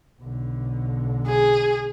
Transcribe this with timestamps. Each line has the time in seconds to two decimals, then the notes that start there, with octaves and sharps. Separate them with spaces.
0.21 B1 D3
1.27 G#4